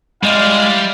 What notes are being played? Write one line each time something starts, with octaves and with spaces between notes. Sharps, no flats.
G3 G#3 E4 D5 D#5 F5